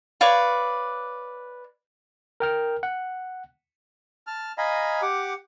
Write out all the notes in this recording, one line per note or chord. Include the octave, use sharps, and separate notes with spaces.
B4 C#5 D5 F5
A#4 G5 F6
F#5
A5 F6
D#5 F5 G#5 A#5 B5
G4 F#5 D6